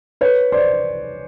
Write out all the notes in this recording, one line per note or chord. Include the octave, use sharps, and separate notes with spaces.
B4 C#5
C5 D5